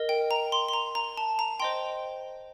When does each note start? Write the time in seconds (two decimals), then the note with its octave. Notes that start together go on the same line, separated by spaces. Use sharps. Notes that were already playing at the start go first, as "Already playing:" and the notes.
Already playing: A#4 D#5
0.09 G5
0.31 A#5
0.52 C6
0.69 C6
0.73 A#5
0.95 A#5
1.17 A5
1.39 A#5
1.60 C5 D#5 G5 C6